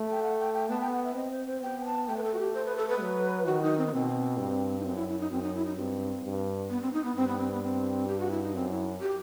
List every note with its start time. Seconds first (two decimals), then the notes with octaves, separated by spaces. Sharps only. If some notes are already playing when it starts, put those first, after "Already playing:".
Already playing: A3
0.11 G5
0.22 F#5
0.38 G5
0.53 G5
0.69 B3 A5
0.81 G5
0.92 F#5
1.03 E5
1.15 C4 D#5
1.30 C5
1.46 C5
1.62 B3 G5
1.85 A5
2.08 A3 G5
2.17 B4
2.23 A4
2.34 F#4
2.39 G4
2.54 C5
2.66 B4
2.77 A4
2.89 B4
3.01 F#3
3.46 D#3 F#4
3.62 D#4
3.78 C4
3.87 B3
3.93 B2 C4
4.38 G2
4.80 D#4
4.85 F#2 C4
4.96 E4
5.08 E4
5.20 D#4
5.32 F#2 C4
5.43 D#4
5.55 E4
5.66 D#4
5.77 G2 C4
6.24 G2
6.70 B3
6.82 C4
6.93 D#4
7.04 B3
7.16 G2 C4
7.28 B3
7.39 C4
7.51 B3
7.63 C4
8.08 G4
8.19 F#4
8.31 E4
8.43 D#4
8.54 F#2 C4
8.71 E4
9.01 G4